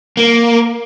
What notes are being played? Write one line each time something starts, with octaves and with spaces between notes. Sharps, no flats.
A#3